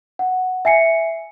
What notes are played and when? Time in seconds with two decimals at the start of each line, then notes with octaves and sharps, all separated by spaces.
0.19 F#5
0.65 E5 G#5 C7 C#7